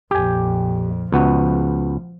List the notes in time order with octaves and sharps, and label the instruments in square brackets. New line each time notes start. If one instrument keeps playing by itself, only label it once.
[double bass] A#1 F2 [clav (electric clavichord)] G4 G#5
[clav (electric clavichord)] C#2 B3 F#4 [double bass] F3